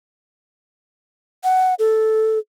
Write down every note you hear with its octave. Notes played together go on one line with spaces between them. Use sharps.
F#5
A4